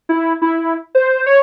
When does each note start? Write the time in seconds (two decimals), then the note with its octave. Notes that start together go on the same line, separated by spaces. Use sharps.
0.09 E4
0.42 E4
0.95 C5
1.26 C#5